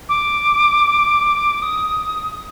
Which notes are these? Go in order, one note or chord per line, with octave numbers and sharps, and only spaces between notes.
D6
D#6